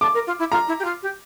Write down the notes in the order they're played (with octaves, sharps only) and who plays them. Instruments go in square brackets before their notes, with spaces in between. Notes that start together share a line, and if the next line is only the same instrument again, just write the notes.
[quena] A5 [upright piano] D6
[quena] A#4
F4
E4
[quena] F4 [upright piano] A#5
[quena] E4
G4
F4
G4